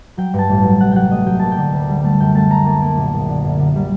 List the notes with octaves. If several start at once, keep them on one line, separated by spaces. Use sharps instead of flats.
F#3 G5
G2
A5
A1
F#3
C3 F#5
F#3 F#5 G5
A3 D#5
F#3 G5
A#3 A5
G5
D3
D2
G3
A3 A5
F#2 G5
A3 A5
A3 A#5
A#3 A5
A#3
A#1
A#1
D3
F#2
D3
G3